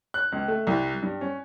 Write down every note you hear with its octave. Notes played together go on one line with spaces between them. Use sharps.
F#6
C#2
A3
C2
G2
C#4